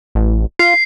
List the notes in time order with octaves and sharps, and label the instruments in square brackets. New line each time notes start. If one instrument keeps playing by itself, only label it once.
[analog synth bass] A1
[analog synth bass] F4 [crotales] C7